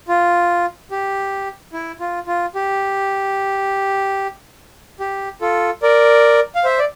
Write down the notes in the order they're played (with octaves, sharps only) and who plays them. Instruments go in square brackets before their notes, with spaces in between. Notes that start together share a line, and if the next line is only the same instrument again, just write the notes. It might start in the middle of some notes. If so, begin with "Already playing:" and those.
[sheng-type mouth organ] F4
G4
E4
F4
F4
G4
G4
F4 A4
A#4 D5
F5
C5 E5
D5